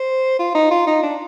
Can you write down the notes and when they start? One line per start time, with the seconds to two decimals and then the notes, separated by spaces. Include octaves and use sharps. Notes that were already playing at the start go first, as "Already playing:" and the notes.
Already playing: C5
0.39 F4
0.55 D#4
0.71 F4
0.87 D#4
1.03 D4